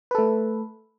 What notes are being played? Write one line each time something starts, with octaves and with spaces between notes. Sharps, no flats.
A3 A4 B4